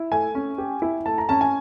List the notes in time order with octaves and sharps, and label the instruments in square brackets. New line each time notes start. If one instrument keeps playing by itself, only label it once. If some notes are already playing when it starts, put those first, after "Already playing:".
Already playing: [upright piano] E4
[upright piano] A3 [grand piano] G#5
[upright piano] C#4
G4
E4
[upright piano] A3 [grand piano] A5
[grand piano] A#5
[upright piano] C#4 [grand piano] A5
[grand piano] G#5